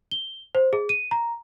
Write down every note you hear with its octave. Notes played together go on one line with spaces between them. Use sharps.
G7
C5
G#4
D#7
A#5